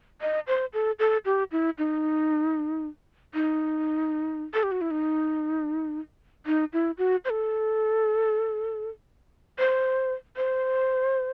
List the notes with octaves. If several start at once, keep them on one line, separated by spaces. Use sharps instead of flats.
D#5
C5
A4
A4
G4
E4
D#4
D#4
A4
G4
F#4
E4
D#4
D#4
E4
F#4
C5
A4
C5
C5